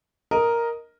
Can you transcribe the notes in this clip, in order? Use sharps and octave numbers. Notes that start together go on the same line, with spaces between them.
A#4 D#5